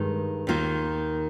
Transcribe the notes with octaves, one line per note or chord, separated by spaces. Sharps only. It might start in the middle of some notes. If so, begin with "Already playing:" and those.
Already playing: G2 D#3 G#3
D#2 D#3 A#3 F4